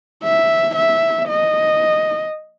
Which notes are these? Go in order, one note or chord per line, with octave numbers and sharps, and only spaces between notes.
E5
E5
D#5